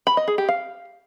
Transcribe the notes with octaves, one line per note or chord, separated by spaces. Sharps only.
B5
D#5
G#4
G4
F5